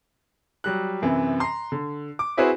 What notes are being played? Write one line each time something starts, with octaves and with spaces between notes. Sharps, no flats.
F#3 G3 F#6
F#2 C3 E3
A#5 C6
D3
D6
C4 E4 F#4 G#4 B4 C5